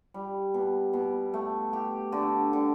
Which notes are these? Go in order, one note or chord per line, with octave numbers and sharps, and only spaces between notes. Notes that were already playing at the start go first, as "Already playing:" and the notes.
G3
B2
B2
A3
G4
D3
D3